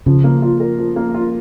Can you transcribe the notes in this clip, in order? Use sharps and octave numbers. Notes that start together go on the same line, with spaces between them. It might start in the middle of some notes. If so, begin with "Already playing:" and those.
C#3 F3
A#3
F4
A#4
F3
A#3
F4